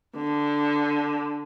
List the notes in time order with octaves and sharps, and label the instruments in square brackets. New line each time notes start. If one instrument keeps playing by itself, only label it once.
[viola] D3